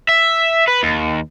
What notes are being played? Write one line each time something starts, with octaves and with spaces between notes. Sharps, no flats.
E5
B4
D#2